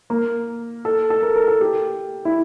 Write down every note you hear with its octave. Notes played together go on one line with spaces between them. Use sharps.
A#3
A4
A4
A#4
A#4
A4
G4
E4